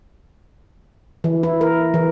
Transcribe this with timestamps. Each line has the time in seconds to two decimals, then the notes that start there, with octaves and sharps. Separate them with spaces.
1.24 E3
1.43 E4
1.61 A#4
1.94 E3